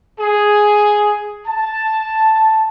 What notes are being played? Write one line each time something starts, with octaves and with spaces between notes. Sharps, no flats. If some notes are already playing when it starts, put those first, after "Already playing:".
G#4
A5